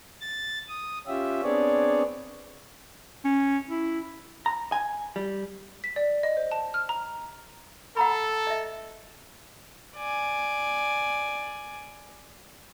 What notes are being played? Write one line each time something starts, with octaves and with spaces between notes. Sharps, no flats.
A6
D#6
C#4 F4 G4 E5
B3 C4 D4 G#4 C#5 D5
C#4
E4
A#5
G#5
G3
B6
D5
D#5
C5
A5
F6
A#5
A4 F#5 A#5 B5
D#5 E5
D5 G#5